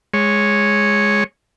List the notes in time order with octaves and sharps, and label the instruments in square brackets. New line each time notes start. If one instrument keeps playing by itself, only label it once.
[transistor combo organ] G#3 C#5